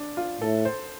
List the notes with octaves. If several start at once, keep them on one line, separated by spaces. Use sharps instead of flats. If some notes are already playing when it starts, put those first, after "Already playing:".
Already playing: D4
F4
A2 A4
C5